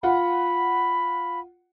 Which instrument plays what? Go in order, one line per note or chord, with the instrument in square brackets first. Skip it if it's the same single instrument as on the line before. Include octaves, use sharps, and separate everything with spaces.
[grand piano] F4 F#5 [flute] B5